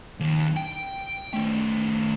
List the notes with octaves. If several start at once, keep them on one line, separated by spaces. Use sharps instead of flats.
D#2
G5
D#3 A3